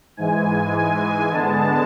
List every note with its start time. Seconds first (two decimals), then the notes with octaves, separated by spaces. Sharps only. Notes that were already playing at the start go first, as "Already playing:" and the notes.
0.17 G#2 E3 G#3 G#5
1.31 D3 G#3 B3 A5